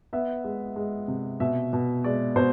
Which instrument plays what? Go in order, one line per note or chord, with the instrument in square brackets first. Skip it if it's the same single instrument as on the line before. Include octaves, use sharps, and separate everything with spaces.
[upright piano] B3 E5
G#3
G#3
C3
B2 E5
B2
G#3 D5
B2 C5